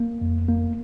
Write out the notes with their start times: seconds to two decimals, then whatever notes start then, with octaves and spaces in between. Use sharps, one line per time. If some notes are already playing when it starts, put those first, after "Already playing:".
Already playing: A#3
0.21 F2
0.49 A#3